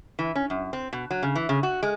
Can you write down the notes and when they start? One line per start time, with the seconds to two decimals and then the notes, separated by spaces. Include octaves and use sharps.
0.19 E3
0.35 C#4
0.50 F#2
0.73 C4
0.93 B2
1.11 F#3
1.23 C#3
1.35 E3
1.49 C#3
1.63 F#4
1.83 G#3